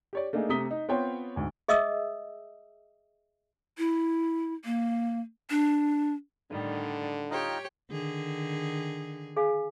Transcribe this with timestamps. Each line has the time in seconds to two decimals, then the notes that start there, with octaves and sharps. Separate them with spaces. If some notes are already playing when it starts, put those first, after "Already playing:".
0.13 G4 C#5 D5
0.33 A3 A#3 D4 D#4 G#4
0.49 C3 A3 A#5 D#6 B6 G7
0.71 D#4
0.89 B3 C4 F4 C5 C#5 G5
1.36 D2 G#2
1.68 G#4 D#5 E5 D#6 E6
3.78 E4
4.65 A#3
5.50 D4
6.51 A2 D3 D#3 G3
7.31 D#4 F4 G4 C#5 D#5 G5
7.91 D3 D#3 G#4
9.37 G#4 F5 G#5